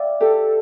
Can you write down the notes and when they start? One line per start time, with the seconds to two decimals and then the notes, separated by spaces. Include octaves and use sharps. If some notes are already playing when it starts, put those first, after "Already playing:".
Already playing: D5 E5 F5 G5
0.20 G4 A4